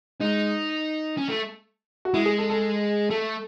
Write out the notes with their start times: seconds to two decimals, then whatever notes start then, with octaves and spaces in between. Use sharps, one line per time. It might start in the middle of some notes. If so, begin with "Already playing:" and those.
0.20 G#3 D#4
1.17 C#4
1.29 A3
2.05 F#4
2.14 G#3 E4
2.26 G#4
2.38 A4
2.50 A4
3.10 A3 A4